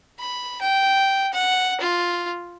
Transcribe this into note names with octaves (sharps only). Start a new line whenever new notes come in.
B5
G5
F#5
F4